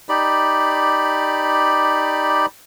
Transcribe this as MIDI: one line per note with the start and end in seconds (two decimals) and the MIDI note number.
0.09 2.46 63
0.09 2.46 67
0.09 2.46 74
0.09 2.46 83